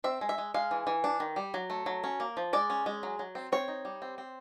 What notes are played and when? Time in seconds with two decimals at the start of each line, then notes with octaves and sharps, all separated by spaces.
0.04 C4 E5
0.21 G#3
0.29 E5
0.38 G#3
0.54 G#3 F5
0.71 E3
0.87 E3
1.04 D4
1.20 D#3
1.36 G3
1.54 F#3
1.70 A3
1.86 F#3
2.04 C#4
2.20 A#3
2.37 F3
2.53 G#3 D5
2.70 C#4
2.86 G#3
3.03 F#3
3.19 F#3
3.35 C4
3.52 C4 C#5
3.68 D#4
3.85 G3
4.02 C4
4.18 C4